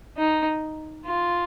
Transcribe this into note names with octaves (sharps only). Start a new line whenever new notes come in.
D#4
F4